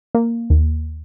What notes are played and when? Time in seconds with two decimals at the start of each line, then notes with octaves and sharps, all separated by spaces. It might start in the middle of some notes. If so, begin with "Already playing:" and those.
0.15 A#3
0.50 D#2